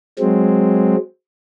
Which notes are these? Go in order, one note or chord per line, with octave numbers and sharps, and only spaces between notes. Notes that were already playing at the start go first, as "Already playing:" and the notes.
F#3 G#3 C4